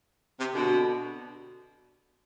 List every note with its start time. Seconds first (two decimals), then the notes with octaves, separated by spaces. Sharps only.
0.40 C3
0.54 B2 D3